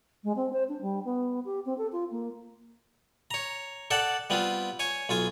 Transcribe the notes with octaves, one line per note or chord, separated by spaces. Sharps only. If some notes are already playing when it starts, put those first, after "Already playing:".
G#3
C4
C5
D4
G3
B3
G4
C4
A4
F4
A#3
C#5 A#5
A4 D5 F#5 G5 A5
G3 B3 C4 F4
C#5 G#5
B1 F4 G#5